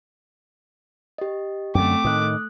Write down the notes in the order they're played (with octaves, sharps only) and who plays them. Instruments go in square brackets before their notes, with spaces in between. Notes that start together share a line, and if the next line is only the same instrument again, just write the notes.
[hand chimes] G4 D#5
[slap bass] F#2 D3 [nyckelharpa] A3 D6 [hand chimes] C4 G5
[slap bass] A2 D#3 [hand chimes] D#6 F#6